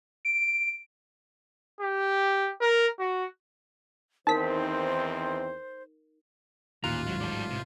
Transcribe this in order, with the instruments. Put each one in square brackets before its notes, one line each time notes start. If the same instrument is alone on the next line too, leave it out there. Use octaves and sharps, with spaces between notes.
[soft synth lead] D7
[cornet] G4
A#4
F#4
[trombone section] E2 D#3 C4 [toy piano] D#4 A#4 [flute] C5 [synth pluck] A5 B6
[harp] A1 D#2 F#6 [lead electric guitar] A#2 [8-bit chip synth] F4 [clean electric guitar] A#5
[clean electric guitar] G#2 [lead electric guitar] F#3
[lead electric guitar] F#3 G3 [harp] D5 A5
[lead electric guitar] C3